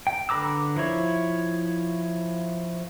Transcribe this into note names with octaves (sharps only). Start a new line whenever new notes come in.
G5
D3 B4 A#5 D6 E6
F3 E4 C#5